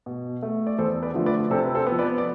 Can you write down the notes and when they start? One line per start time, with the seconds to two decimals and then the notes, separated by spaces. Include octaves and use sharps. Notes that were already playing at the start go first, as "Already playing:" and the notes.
0.06 B2
0.42 A3
0.67 D5
0.78 E2 A4 C5
1.03 B4 D5
1.14 D3 F3 A3
1.26 B4 D5
1.51 C3 A4 C5
1.66 B4
1.75 A4 C5
1.87 F3 B3
1.99 B4 D5
2.18 D5